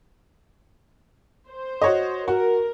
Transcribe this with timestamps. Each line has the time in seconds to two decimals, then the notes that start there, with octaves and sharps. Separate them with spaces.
1.49 C5
1.81 F#4 C#5 D#5
2.28 F#4 A#4